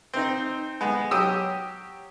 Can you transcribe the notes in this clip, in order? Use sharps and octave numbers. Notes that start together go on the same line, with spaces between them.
C4 D#4
G#3 B3
F#3 G4 D#6 E6